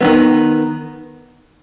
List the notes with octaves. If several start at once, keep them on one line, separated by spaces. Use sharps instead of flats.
D#3 F#3 B3